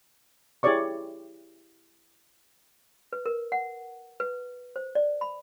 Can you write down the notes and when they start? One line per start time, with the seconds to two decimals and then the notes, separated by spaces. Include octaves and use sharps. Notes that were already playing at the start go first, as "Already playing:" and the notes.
0.63 E4 G4 G#4 C#5 D5 C#6
3.13 B4
3.26 A#4
3.52 F#5
4.20 B4
4.76 C5
4.95 D5
5.21 B5